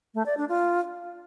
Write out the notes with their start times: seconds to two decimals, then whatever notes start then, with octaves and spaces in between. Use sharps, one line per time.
0.14 A3
0.26 D5
0.37 D4
0.49 F4